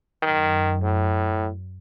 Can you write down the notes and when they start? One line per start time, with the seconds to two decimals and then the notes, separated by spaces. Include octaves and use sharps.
0.23 F#2 D#3
0.82 A2